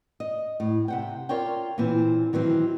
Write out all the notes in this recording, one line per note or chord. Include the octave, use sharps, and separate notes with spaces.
D#5
A2
C3 F#5 G5
F4 A#4 C#5 D5 G5
A#2 E3 C4
D#3 E3 F#3 C4